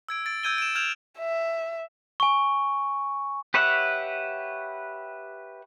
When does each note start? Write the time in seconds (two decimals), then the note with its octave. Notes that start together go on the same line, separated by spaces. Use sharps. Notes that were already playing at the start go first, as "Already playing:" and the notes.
0.09 E6 G#6 D7
0.26 A6 D7
0.43 E6 G6 G#6 D#7 G7
0.58 D7 E7
0.75 F6 G6 G#6 E7 F7
1.19 E5
2.20 G#5 C#6
3.54 G4 B4 C#5 E5 F#5